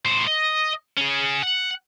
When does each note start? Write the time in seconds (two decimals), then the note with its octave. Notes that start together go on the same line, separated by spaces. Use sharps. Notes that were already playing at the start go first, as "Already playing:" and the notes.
0.05 A2 C5
0.27 D#5
0.97 C#4 G#4
1.42 F#5